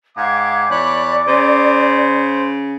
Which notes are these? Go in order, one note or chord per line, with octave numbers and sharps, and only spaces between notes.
G#2 F5 G5 D6 G#6
E2 C#5 D5 B5 F#6
C#3 C5